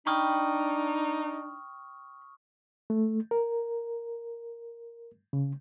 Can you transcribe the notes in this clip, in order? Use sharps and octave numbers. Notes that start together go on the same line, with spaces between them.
D4 D#4 G5 B5 C#6 D#6 F6
A3
A#4
C#3